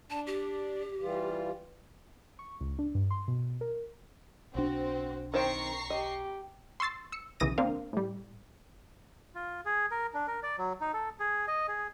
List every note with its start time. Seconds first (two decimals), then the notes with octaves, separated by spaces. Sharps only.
0.10 D4 A5
0.27 G4
1.01 E3 G3 F4
2.39 C#6
2.61 C#2
2.79 D4
2.95 G2
3.11 C6
3.28 B2
3.61 A#4
4.55 B1 C4 D4 F#4
5.34 D#3 C4 C5 G5 A#5 C#6 C7
5.90 G4 D#5
6.80 C6 C#6 E6 A6 C7
7.12 E6 C#7
7.40 B1 C#3 E3 D#6 A#6 D#7
7.58 A#3 C4 D4 A#4 F5
7.93 A2 G3
9.35 F4
9.65 G#4
9.91 A#4
10.14 D4
10.28 A#4
10.43 D5
10.58 F#3
10.81 D#4
10.93 A4
11.20 G#4
11.48 D#5
11.68 G#4